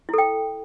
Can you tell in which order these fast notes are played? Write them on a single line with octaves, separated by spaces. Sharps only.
E4 A4 G5